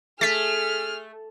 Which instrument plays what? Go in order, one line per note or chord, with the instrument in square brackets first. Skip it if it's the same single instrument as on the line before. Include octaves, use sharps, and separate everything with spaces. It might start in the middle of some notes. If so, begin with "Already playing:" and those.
[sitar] A3 [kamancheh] G#4 F6 [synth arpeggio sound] A6 B6